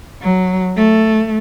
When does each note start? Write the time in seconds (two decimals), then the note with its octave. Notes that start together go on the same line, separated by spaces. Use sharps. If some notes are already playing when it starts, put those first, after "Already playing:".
0.22 F#3
0.77 A3